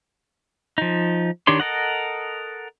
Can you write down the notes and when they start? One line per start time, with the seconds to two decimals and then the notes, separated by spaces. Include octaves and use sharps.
0.78 F3 D#4
1.47 D#3 D4 G4 C#5 C6
1.60 A4 A#4 D#5 F#5